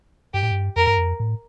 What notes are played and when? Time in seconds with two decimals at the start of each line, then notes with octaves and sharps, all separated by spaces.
0.34 G2 G4
0.43 A2
0.51 G2
0.76 F2 A#4
0.87 G2
0.98 F2
1.20 A2